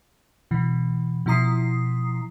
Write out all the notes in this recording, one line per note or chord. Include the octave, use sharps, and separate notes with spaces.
B2 E3
B2 F3 E4 A#5 D#6 C7